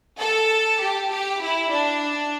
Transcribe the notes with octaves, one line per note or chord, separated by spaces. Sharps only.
A4
G4
G4
E4
D4